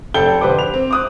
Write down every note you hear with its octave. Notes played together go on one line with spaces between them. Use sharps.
F1 A4 G5 G6 G7
D3 G3 B4 C5 D6
F7
C4
D6 D#6 F#6